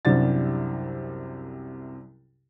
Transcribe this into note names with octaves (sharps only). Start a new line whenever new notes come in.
C2 F#2 C3 G3 D4 A6